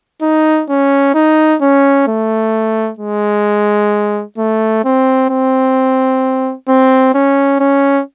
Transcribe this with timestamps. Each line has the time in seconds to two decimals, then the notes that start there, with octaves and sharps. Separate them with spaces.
0.22 D#4
0.69 C#4
1.14 D#4
1.61 C#4
2.08 A3
2.99 G#3
4.38 A3
4.84 C4
5.29 C4
6.69 C4
7.14 C#4
7.60 C#4